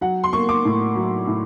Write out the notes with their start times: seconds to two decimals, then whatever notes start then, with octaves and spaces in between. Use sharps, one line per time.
0.01 F#3 F#5
0.24 C6
0.33 A#3 C#6
0.49 D6
0.65 A2
0.95 F#3
1.27 A2